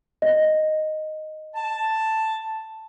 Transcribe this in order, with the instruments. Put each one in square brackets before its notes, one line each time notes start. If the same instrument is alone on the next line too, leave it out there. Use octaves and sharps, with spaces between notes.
[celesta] D#5
[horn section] A5